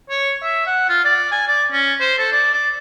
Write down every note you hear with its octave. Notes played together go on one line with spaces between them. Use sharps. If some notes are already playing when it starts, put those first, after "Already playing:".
C#5
E5
F#5
F4
D5
G#5
D5
C#4
C5
A4
D5
D5